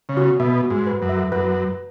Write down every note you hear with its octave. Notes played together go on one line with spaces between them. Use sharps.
C#3
F#4
B2 E5
F#4
G#2
B4
F#2
E5
F#2 B4
B4